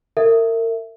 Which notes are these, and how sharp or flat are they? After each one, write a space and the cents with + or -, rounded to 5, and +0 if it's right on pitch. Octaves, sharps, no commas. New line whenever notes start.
A#4 -35 E5 +0